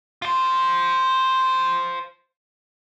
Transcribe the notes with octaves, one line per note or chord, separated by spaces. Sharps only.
F4 C5